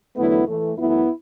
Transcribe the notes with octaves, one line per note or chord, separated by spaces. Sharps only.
E2 D3 F#3 A3 B3 E4
A2 E3 A3
F#2 E3 A3 B3 E4